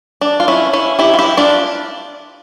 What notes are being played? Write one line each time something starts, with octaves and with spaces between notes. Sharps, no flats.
D4
F4
C#4 E4
C#4 E4
E4 G4
F4
E4 G4
D4 F4